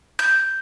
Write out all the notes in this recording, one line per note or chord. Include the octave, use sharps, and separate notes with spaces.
G6